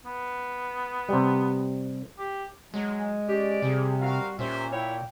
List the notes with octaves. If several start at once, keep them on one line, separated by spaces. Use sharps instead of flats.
B3
C3 G3
G4
F#3 G#3
C#4 G4 D5
C3 G3 G#4
C4 F#4 A#4 F5
A#2 C#4 G4 C5 E5
E4 C#5 G5